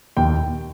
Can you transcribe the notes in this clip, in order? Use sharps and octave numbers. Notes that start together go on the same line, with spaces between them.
D#2 G5